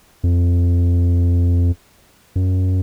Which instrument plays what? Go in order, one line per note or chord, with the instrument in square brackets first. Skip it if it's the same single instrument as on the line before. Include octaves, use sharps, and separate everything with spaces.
[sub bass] F2
F#2